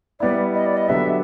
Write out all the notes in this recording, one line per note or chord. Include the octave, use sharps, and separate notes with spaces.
G3 B3 E4 D5
D#5
D5
D#5
D3 F#3 B3 D4 G4 E5